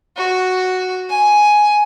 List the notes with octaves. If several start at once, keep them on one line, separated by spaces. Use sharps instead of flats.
F#4
G#5